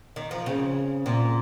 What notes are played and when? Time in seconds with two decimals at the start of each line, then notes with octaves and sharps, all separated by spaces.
0.16 D#3
0.31 F3
0.46 C#3
1.06 A#2